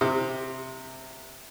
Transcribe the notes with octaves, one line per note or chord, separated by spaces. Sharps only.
C3